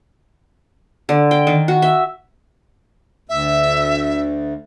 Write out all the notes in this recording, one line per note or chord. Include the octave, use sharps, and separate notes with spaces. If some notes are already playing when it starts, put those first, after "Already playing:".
D3
G5
D#3
F#4
E5
D2 E5